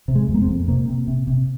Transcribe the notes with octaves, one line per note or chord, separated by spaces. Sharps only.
C3
G#3
F2
A#3
C4
F2
C3 A#3
C3
C3
C3